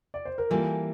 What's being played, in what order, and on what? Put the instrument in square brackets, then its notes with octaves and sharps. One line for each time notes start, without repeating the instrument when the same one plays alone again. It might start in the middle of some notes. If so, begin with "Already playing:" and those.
[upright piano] D5
C5
A#4
[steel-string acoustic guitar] E3 G3 A#3 [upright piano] F4 A4